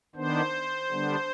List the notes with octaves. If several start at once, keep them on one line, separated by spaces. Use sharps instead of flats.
D#3 B3 D4 C5
D3 G3 B3 D4